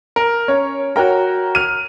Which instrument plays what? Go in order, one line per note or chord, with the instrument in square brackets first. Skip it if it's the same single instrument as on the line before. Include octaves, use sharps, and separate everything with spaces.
[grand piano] A#4
[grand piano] C#4 [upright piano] C#5
[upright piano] F#4 A#4 [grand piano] C#5 G5 A#5
[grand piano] F6 D#7